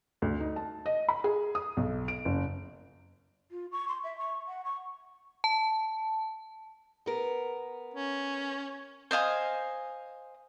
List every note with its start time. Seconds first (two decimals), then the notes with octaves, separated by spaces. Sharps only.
0.22 D2
0.40 D#4
0.56 A5
0.86 D#5
1.09 B5
1.24 G#4
1.55 D#6
1.77 B1
2.08 D7
2.25 F#1
3.51 F4
3.72 C#6
3.89 C6
4.04 E5
4.18 C#6
4.48 F#5
4.65 C#6
5.44 A5
7.06 B3 A#4
7.94 C#4
9.11 C5 D#5 F5 G#5